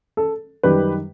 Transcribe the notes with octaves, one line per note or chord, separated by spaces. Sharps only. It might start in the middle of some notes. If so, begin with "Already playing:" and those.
A4
F#2 D#3 G3 G4 B4